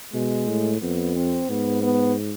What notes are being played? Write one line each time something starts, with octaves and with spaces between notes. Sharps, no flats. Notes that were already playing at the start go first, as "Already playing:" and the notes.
B2 G#3
A2
F2 B3
C4
G#2 B3
B3